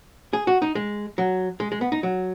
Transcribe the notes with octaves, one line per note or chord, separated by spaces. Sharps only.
G#4
F#4
D#4
G#3
F#3
G#3
G#3
B3
D#4
F#3